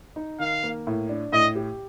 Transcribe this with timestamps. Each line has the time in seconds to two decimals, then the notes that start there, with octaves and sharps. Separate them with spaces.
0.16 D#4
0.39 D#3 F5
0.63 A#3
0.87 A2
1.09 D4
1.33 A2 D#5
1.56 G4